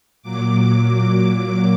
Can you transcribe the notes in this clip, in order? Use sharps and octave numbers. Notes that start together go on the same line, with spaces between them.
A#2 F#3 D6